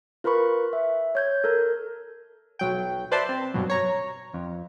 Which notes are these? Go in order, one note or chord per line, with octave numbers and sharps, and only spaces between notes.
F4 A#4 B4 B5 C#6
E5
C#5 G6 G#6
A4 A#4
B1 F#3 G5
B4 C5 D5 E5 A5 C6
C4
G2 B2 F#3
C#5 A#5
F2